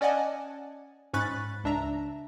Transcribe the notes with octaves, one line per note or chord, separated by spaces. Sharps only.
C#4 D5 D#5 F#5 G#5 A5
G#2 C#4 B5 C#6 F#6 A6
C#2 D4 E5 A#5